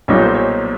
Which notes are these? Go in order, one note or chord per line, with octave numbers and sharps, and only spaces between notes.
B1 A#2 G3 A#3 D#4 C#5
C5
C#5